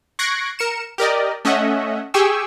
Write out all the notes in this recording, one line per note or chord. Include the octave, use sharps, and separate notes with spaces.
C#6 F#6 G#6 A#6 C7 D7
A#4 C#7 E7
G4 A#4 D5 D#5
A3 C#4 D#5 E5 F#5
G4 G#4 G5 G#5 C#6 E6